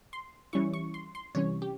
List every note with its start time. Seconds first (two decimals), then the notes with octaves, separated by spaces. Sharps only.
0.13 C6
0.53 E3 G3 C#4 E4 C#6
0.73 C#6
0.94 C6
1.15 C6
1.35 C3 E3 G3 C#4 C#5
1.62 G4